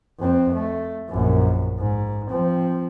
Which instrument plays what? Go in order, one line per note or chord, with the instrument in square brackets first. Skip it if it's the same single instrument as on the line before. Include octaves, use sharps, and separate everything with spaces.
[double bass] F2 C4
A3
A#1 F#2
G#2
F3 C4